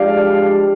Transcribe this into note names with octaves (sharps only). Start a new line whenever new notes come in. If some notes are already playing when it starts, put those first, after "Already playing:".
Already playing: F3 G#3 D4 G4 D5 F5